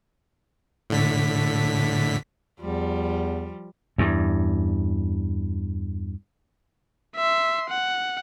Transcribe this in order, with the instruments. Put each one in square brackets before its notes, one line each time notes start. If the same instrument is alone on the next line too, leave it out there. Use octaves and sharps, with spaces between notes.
[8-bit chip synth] A2 D3 B6
[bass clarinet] E2 [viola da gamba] F3 G3
[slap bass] E2 G2
[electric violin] E5 C6
F#5